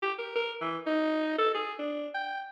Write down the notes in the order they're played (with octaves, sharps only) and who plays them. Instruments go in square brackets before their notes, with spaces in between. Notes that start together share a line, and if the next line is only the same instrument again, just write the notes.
[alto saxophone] G4
A#4
A#4
E3
D#4
A4
G#4
D4
G5